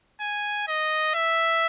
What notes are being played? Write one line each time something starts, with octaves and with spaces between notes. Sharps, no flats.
G#5
D#5
E5